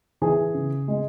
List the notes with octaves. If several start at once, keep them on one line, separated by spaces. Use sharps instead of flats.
E3 G#4
C#3
G#3